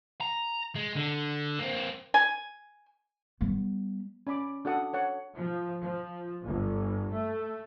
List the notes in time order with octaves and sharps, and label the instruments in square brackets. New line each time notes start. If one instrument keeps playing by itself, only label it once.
[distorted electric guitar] A#5
G#3
D3
A#3 C4
[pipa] G#5
[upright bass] G3 B3
[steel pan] C#4 D5 B5 D6
D4 F#4 A4 F#5 D#6
A4 C#5 F#5
[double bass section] F3
F3
G1
A3